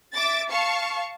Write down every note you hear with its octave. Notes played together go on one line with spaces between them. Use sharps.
E5 D6 A6
F5 A5 C#6